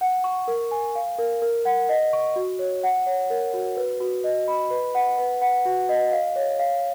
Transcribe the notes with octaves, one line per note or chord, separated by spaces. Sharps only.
F#5
C#6
A#4
G#5
F5
A#4
A#4
F#5
D#5
C#6
F#4
C#5
F#5
C#5
A#4
F#4
B4
F#4
D#5
B5
B4
F#5
B4
F#5
F#4
D#5
F5
C#5
F5